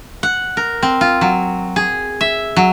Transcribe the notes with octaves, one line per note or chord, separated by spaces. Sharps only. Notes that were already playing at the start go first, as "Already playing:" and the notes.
F#5
A#4
C4
F4
F#3
G#4
E5
F#3